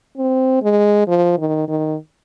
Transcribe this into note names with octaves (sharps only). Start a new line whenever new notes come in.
C4
G#3
F3
D#3
D#3